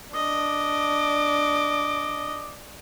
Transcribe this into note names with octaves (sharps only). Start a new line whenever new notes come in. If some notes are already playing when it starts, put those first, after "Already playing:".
D4 D#5 D6